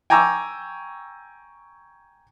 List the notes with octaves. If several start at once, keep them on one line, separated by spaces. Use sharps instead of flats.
G5 G#5 A#5 C#6 D6 E6